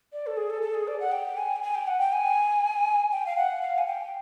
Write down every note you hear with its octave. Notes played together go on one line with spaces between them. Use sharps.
D5
A4
G#4
A4
A4
G#4
D5
F#5
G5
G#5
G5
G#5
G5
F#5
G5
G#5
G5
F5
F#5
F5
G#5
G5